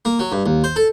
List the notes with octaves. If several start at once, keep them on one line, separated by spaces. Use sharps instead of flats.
A#3
F#3
G2
D#2
C5
A4